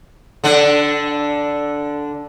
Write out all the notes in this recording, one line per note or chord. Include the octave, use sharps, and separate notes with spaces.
D3 D4